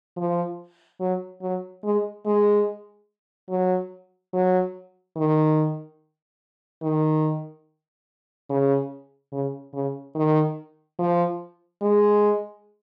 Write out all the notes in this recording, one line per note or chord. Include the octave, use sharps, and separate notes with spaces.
F3
F#3
F#3
G#3
G#3
F#3
F#3
D#3
D#3
C#3
C#3
C#3
D#3
F3
G#3